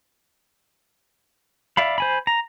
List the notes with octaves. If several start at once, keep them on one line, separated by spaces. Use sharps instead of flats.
D5 E5 F5 B5
C5 G#5 B5
A#5